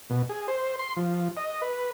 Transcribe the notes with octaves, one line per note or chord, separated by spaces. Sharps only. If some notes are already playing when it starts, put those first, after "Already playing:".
B2
G#4
C5
C6
F3
D#5
B4